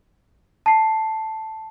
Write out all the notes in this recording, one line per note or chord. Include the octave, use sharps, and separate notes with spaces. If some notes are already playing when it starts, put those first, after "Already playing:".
A5 C7